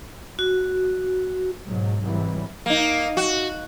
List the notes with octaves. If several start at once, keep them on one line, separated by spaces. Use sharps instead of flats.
F#4
G#2 B2 F#3
G#2 C3 E3 F#3 G3
A#3 D#4
F#4